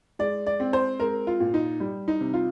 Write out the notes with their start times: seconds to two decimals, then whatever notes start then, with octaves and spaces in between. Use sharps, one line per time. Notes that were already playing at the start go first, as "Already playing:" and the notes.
0.19 G#3 D5
0.46 D5
0.60 C4
0.73 C5
1.00 G#3 A#4
1.27 F4
1.40 A#2
1.54 D#4
1.80 G3
2.08 D#4
2.21 C3
2.34 F4